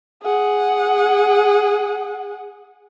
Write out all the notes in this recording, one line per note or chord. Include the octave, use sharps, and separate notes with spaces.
G#4 F#5